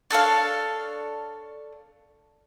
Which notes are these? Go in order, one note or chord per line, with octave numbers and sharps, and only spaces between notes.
D4 A4 C#5 F5